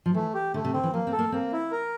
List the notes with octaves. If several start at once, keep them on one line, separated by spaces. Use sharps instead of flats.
F3
E3 A3
G4
D3 A3
C3
D3 C4
E3
F3 A#3
C4
A4
A#3
A#3 C4
E4
A#4